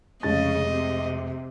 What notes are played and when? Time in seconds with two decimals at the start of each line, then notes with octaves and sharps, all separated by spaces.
0.23 F1 C#3 G#3 D#5 A6
0.68 C3